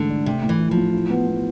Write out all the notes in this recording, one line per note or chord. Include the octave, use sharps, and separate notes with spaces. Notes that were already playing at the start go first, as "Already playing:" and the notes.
Already playing: G#2 D3 E3 A3
D4
C3 A3
A2
E3
E4
F3
A2
E4
B3
B3